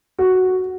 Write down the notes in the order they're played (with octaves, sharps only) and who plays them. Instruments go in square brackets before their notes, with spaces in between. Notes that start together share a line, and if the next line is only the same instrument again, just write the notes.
[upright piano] F#4